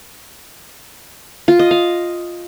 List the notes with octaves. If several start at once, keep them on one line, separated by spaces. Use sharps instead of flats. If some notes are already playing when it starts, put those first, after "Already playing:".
F4
D#5
F5